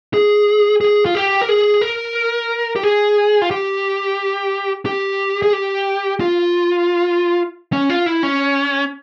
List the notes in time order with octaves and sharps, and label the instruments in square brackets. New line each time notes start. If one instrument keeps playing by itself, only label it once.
[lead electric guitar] G#4
G#4
F4
G4
A#4
G#4
A#4
G4
G#4
F4
G4
G4
G#4
G4
F4
C#4
F4
E4
C#4